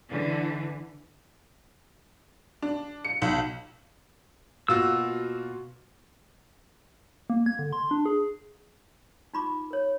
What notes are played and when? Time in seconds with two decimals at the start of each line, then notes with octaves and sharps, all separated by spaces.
0.10 D3 E3
2.62 D4
3.05 C#7
3.22 B1
4.68 B2 A#3 F4 F#4 E6
7.30 A#3
7.46 G#6
7.59 D3
7.73 C6
7.91 D4
8.06 G#4
9.34 D#4 F4 B5 C#6 D6
9.71 A#4 C#5